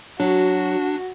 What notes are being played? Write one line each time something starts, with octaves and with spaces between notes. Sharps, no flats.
F#3 D4 F#4